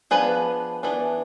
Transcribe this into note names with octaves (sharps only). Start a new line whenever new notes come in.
F3 B3 D4 G#4 B4
E3 B3 D4